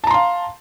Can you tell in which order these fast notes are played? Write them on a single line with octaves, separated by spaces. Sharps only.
A5 A#5 C6 F5